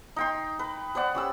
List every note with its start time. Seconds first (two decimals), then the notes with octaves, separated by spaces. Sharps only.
0.16 D#4 G5 C6
0.59 B4
0.95 B4 C5 D5 F#5
1.15 C#4 G4 E6